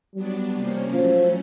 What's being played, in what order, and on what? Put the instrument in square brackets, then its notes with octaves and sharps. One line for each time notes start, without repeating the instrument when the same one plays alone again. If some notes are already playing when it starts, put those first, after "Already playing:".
[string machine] F#3 B3 D4 [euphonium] G3
[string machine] C3 F3 A#3 C#4
[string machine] A2 F#3 A3 C#4 [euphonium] F3